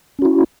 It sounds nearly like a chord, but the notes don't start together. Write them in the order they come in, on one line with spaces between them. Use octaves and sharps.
C#4 F#4 E4